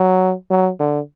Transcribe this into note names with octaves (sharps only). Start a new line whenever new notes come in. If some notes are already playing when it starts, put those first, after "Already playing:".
Already playing: F#3
F#3
D3